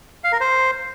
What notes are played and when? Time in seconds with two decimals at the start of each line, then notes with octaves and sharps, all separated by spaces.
0.24 F5
0.32 A#4
0.41 C5